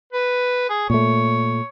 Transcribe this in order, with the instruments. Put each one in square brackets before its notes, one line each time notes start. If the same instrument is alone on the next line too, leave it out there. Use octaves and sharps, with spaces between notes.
[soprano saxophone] B4
G#4
[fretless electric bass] A#2 A3 [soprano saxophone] C#5